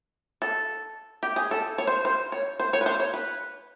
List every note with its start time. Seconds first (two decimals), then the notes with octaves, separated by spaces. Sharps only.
0.42 A4
1.23 G4
1.36 G#4
1.51 A4
1.78 C#5
1.87 C5
2.05 C5
2.32 C#5
2.60 C5
2.73 C#5
2.81 B4
2.86 C5
3.00 C#5
3.14 B4